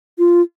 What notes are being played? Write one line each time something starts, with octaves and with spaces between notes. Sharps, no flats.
F4